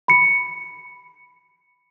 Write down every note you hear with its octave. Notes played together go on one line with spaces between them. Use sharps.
B5 C#7